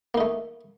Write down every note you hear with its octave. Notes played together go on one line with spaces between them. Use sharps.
A3 A#3 D#4